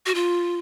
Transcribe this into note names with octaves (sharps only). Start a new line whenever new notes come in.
F#4
F4